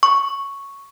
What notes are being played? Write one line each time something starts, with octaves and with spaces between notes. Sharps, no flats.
C#6